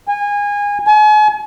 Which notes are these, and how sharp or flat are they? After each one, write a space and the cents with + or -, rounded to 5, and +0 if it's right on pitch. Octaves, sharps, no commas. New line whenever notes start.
G#5 -25
G#5 +40